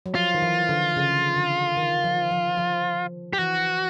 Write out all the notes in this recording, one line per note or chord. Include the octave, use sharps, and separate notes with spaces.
F#3
F3 F4
D#3
E3
D3
C#3
D3
D#3
F3
F3
F3
G4
E3 F#4